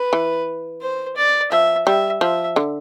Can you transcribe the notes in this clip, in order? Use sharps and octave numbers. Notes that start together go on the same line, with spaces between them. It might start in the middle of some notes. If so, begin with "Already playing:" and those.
Already playing: B4
E3
C5
D5
F3 E5
G3 E5
F3 E5
D3